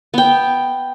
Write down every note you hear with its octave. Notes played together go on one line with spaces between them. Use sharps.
B3 G5